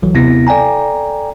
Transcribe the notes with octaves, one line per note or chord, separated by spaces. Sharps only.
B1 E3 F#3
D#2 C3 B3 E4 A#6
A4 D5 G5 G#5 A#5